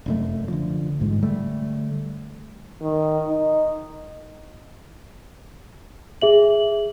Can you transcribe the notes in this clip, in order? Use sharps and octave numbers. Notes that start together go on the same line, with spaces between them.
F1 F#2 A3
D3 F3
A1 G#2 G#3
D3 G3 A3
D#3
D#4
G#4 E5 F#7